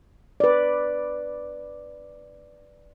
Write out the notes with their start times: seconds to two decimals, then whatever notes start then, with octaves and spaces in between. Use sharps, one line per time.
0.40 B4 D5